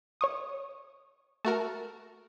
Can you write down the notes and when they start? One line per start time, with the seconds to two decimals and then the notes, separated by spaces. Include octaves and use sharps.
0.21 C#5 C#6 D#6
1.45 A3 F#4 A#4 A5